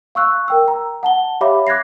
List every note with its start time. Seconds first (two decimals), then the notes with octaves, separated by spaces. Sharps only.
0.15 F5 C#6 E6 F#6
0.48 A#4 G5 E6
0.68 A#5
1.03 F#5 A5 G7
1.41 G4 C#5 E5 F5 B5 D6
1.67 D6 F#6 G#6 A#6 C7